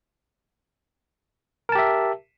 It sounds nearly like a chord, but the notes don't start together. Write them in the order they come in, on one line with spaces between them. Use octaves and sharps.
A#4 A5 G4 E5